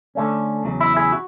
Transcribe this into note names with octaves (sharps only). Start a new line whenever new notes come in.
D3 A3 C#4
E2 C#3 F#3
E4
E4 G#4
F#4